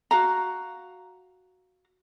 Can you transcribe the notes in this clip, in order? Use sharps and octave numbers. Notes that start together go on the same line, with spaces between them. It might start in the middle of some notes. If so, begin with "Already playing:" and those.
F#4 F5 A#5